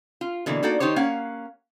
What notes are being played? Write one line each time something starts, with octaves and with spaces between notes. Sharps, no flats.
F4
B2 D3 E3 A#3
A#3 D#4 F#4 A4 D5
D#3 D#4 G4 C5 C#5
A#3 C#4 F5 F#5